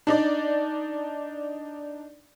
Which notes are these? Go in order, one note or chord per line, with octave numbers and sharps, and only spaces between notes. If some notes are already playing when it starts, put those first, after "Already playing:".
D4 D#4 D5